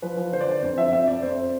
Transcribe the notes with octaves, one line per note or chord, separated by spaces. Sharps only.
F3 B4
F3
D3 C5
D5
D3 C5
F2 C5
F3 E5
F2 E5
F2 D5
F2 C5